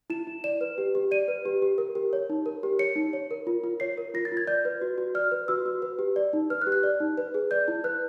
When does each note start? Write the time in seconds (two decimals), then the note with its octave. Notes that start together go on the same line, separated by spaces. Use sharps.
0.10 E4 E7
0.27 E4
0.44 D5 E7
0.61 B4
0.78 G4
0.95 G4
1.11 D5 D#7
1.28 B4
1.45 G4
1.62 G4
1.78 A#4
1.95 G4
2.13 C#5
2.30 D#4
2.46 A#4
2.63 G4
2.79 C#5 C#7
2.96 D#4
3.13 C#5
3.31 A#4
3.47 F4
3.64 F4
3.80 C#5 C7
3.98 A#4
4.14 F4 A#6
4.25 A6
4.32 F4
4.37 G#6
4.47 D5 G6
4.65 B4
4.82 F#4
4.98 F#4
5.15 D5 F6
5.32 B4
5.48 F#4 E6
5.66 F#4
5.82 B4
5.99 G4
6.16 D5
6.33 D#4
6.50 B4 F6
6.62 F#6
6.67 G4
6.72 F#6
6.83 D5
7.00 D#4
7.18 B4
7.34 G#4
7.51 D5 G6
7.68 E4
7.84 B4 F#6